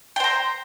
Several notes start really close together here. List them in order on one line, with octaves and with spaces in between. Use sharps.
G5 C5 A#5